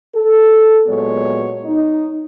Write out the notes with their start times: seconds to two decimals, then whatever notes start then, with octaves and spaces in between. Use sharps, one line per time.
0.14 A4
0.86 A#2 F#3 G#3 B3 C#5
1.64 D#4